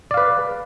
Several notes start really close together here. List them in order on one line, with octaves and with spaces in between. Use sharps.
D5 F5 B4